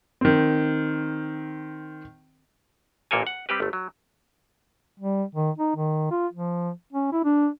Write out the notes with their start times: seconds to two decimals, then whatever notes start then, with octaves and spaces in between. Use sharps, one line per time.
0.21 D#3 C4
3.11 A1 A#2 A#3 A4 A#4 G#5
3.27 F#5
3.49 G3 C4 G4 B4
3.60 G1 A3
3.73 F#3
4.99 G3
5.35 D#3
5.58 D#4
5.76 D#3
6.11 F4
6.33 F3
6.93 C#4
7.12 E4
7.24 D4